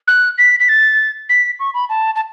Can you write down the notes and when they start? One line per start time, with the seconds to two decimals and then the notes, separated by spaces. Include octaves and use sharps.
0.07 F#6
0.38 B6
0.60 B6
0.69 A6
1.29 B6
1.59 C#6
1.74 B5
1.89 A5
2.15 A5